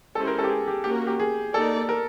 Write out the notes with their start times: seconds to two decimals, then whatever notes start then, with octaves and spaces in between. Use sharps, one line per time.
0.15 G#3 C#4 E4 G4 A4 C5
0.27 A#4
0.39 A4
0.44 G4
0.49 G#4
0.68 G4
0.84 A#3 C#4 F#4 G4 A#4
1.07 G4
1.20 G#4
1.53 A#3 D#4 G4 A4 A#4 D5
1.89 A#4